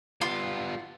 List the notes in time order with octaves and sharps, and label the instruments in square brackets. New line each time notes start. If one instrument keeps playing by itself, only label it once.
[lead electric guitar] G3 B3 [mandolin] F4